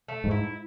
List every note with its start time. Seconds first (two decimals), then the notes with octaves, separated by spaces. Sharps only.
0.08 A3
0.24 G#2
0.31 E4